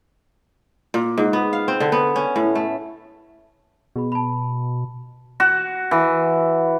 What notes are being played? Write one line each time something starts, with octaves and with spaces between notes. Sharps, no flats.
A#2
G#2
B3
F5
C4
D3
B3
C#4
A2
A3
B2 G#4 B5
A5 B5
F#4
E3